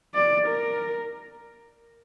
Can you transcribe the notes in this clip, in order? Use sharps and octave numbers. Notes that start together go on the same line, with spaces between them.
D5
A#4